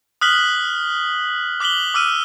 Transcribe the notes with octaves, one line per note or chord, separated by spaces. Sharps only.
D#6 F6 F#6 B6 F#7 G7
D6 F#6 B6 F#7 G7
D6 E6 F6 D#7